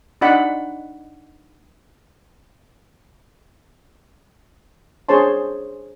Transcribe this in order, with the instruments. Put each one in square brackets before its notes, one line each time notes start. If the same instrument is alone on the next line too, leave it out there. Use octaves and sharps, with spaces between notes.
[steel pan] D4 D#4 D5 F#5 B5
D4 G#4 C5 C#5 A5 C6